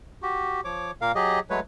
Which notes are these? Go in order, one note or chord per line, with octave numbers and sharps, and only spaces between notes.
F#4 G4
F3 C#5 D6
A#2 A#3 A#4 F5
F#3 G4 G#4 D#5
F#3 G#3 A3 B4 C#5